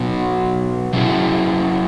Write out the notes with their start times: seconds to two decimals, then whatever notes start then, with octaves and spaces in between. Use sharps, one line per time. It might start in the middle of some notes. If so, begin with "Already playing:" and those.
Already playing: B2 F#3 B3 F#4
0.93 F#3 C#4 E4 G#4